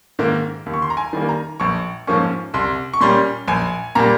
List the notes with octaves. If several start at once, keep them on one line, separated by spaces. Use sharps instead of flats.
G#2 D#3 A#3
D#2
C#6
C6
A#5
G#5
D#3 G3 A#3
A#5
A#1 C#6
G#2 F3 A#3 C#4 C#6
C2 C6
C#6
A#2 G3 C#4 C6
A#1 G#5
A#2 G3 A#5